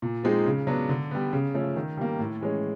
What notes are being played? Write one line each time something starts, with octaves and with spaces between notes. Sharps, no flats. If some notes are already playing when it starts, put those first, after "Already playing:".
A#2
F3 G#3 C4 D#4
C#3
F#3 B3 D4
D3
G3 B3
C#3
F3 A3 C#4
D#3
G3 A#3
A2
E3 G#3 C#4